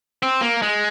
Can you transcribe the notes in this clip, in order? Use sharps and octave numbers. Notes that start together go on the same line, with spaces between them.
C4
A#3
G#3